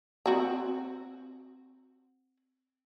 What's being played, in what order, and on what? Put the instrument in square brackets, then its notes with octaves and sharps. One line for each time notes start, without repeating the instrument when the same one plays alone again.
[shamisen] C4 F#4 A#5